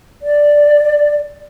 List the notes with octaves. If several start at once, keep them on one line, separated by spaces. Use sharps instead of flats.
D5